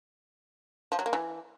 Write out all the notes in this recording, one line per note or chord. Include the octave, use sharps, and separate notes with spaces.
F3
F#3
A#3
E3